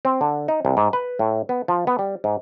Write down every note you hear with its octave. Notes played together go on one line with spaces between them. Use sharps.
C4
D3
D#4
C2
G#2
B4
A2
B3
F3
B3
G3
G#2